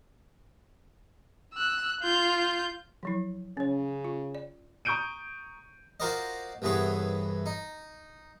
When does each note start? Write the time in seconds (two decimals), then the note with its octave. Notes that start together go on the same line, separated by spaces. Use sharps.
1.54 E6 F#6
2.01 F4 G6
3.03 F3 F#3 E4
3.57 C#3 C#4 C#5
4.04 F4
4.35 D5
4.85 A#5 C#6 D#6 G6 D7 D#7
6.00 F4 F#4 A#4 C5 D5 D#5
6.62 C2 G2 E3 B3 G#4 C#5
7.46 D#4